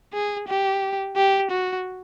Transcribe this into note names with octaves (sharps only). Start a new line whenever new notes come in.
G#4
G4
G4
F#4